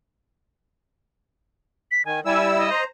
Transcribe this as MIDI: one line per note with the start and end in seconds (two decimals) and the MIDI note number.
1.91 2.02 95
2.05 2.20 51
2.05 2.20 80
2.25 2.69 55
2.25 2.69 64
2.25 2.47 80
2.25 2.69 88
2.57 2.81 75
2.70 2.84 72
2.70 2.84 82